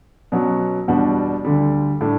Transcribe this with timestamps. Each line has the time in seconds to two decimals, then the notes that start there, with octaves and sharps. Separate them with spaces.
0.32 B2 F#3 C#4 F#4
0.88 E2 B2 G3 D4 F#4
1.45 D2 D3 G3
2.01 A2 G3 D4